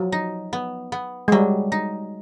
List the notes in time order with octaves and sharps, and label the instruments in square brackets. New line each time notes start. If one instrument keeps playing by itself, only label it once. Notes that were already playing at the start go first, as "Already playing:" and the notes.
Already playing: [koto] F3 [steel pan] F#3
[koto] D#4
B3
B3
[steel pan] G#3
[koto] F#3 [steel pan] G3
[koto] D#4